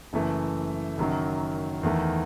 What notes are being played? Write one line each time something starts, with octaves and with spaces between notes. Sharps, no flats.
F#1 F#2 E3 A3
F#1 F#2 D#3 F#3
E2 D#3 A3